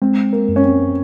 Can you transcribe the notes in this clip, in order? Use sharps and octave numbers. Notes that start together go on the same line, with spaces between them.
G#3 C4
A#3
F#2
C#4
C4